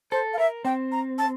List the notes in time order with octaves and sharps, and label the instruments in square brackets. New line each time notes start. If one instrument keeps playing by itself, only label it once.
[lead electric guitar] A4 [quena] C5
[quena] F5
[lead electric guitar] A#4 [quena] E5
[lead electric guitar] C4 [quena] G5
[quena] A#5
A5